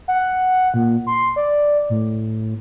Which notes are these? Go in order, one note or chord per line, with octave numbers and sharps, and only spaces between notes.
F#5
A#2
C6
D5
A2